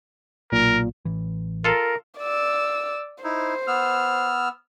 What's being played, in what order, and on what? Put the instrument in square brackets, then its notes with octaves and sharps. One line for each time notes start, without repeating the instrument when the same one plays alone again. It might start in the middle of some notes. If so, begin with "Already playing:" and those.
[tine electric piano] B1 A#2 [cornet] A#4
[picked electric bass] A1 E3
[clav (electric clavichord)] F4 A4 F5 [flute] A#4
[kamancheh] D5 E6
[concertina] D#4 E4 [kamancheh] C5
[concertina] B3 E6 F6